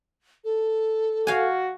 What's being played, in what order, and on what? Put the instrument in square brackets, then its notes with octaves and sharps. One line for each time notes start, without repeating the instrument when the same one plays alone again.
[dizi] A4
[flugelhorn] F#4 [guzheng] F5 G#5